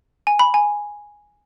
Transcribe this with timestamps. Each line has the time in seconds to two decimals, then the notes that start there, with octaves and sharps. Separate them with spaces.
0.27 G#5
0.39 B5
0.54 G#5